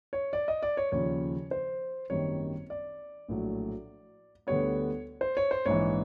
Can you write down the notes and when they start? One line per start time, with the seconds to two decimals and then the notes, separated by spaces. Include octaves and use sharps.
0.13 C#5
0.33 D5
0.48 D#5
0.63 D5
0.77 C#5
0.92 D#2 C#3 F3 C#5
1.51 C5
2.10 G#1 F#2 D#3 G3 A#3 C#5
2.70 D5
3.28 A#1 A2 F#3
4.47 D2 D3 G3 B3 C#5
5.21 C5
5.37 C#5
5.51 C5
5.66 A#1 G#2 E3 C#5